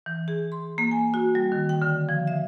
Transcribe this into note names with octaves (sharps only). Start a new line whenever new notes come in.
E3
G#4
C6
A#3
G#5
F#4
G3
D#3
G5
D3
F3
E5